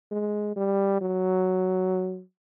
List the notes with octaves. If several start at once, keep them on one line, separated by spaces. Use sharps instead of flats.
G#3
G3
F#3